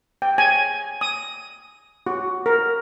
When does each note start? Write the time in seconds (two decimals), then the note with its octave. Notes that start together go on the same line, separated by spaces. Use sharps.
0.22 G5
0.38 G#5
1.01 D#6
2.07 F#4
2.46 A#4